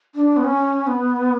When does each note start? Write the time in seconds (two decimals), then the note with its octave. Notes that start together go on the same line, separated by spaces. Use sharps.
0.15 D4
0.37 B3
0.44 C#4
0.87 B3